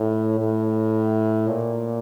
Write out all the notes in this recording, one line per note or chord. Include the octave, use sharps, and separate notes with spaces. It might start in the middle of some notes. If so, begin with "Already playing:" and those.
Already playing: A2
A2
A#2